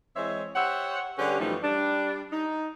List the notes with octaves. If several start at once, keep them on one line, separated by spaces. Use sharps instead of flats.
E3 G#3 C4 C5 C#5 E5
G4 C5 C#5 E5 F#5
D3 G3 C#4 G4 G#4 B4
F#2 E3 F3 G3 A3 D#4
G3 D4
D#4